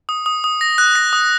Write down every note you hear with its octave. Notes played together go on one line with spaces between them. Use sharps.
D#6
D#6
D#6
A#6
F#6
A#6
D#6